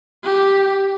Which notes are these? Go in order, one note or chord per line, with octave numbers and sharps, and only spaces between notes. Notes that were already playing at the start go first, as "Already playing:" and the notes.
G4